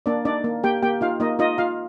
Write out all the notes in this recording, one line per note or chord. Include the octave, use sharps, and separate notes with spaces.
A#3 D4 D5
D4 D#4 D5
A#3
A#3 G4 G5
A#3 G4 G5
D#4 F4 F5
A#3 D#4 D#5
D#4 F4 D#5
F4 F5